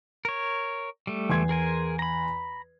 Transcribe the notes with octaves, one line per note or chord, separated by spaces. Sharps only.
A#4 C#5
G3 A3
E2 C6 G#6
G#4 A#4 G#5
A#5 B5